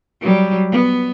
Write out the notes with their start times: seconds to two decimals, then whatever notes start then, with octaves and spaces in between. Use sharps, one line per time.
0.21 F#3 G3
0.72 B3